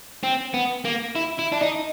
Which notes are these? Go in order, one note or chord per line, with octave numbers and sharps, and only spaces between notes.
C4
B3
A#3
E4
E4
D4
D#4